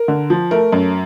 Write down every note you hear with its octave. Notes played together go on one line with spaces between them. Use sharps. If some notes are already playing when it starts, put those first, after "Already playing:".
Already playing: A#4
D3
F3
A3 A#4
F#2